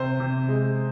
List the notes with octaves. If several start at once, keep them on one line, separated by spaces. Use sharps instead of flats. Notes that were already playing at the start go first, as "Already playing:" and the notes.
Already playing: C3 C5
C3
G#3